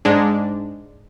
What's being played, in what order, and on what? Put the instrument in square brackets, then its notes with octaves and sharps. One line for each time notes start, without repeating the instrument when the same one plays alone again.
[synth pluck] G#2 G#3 D4